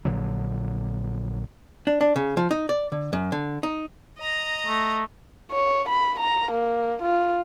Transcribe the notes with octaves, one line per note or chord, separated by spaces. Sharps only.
A#1 A#2 D3 F#3
D4
D4
C#3
F3
D#4
D5
D3
F#2
D3
D#4
D#5 A#5
A3
C#5
B5
A#5
A#3
F4